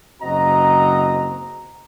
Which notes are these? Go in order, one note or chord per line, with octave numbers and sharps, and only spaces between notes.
F#1 C4 F#4 D#5 A#5